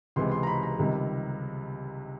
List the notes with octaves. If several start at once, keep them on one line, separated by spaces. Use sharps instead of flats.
C#2 C3 E3 G#3 C6
C6
A#5
B5
A#5
C#2 C3 D#3 G3